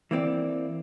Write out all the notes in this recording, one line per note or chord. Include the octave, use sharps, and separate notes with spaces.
E3 A#3 C4 D5